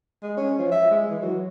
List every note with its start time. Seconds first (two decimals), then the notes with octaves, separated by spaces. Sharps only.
0.22 G#3
0.37 C#4
0.58 F3
0.71 E5
0.91 G#3
1.10 E3
1.22 F#3